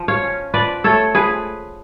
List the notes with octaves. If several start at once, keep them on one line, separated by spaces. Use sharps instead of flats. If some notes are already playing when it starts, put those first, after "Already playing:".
Already playing: F3
C#5 F5
C#4
F3 B4 D5
A3 A4 C#5
F3 G#4 B4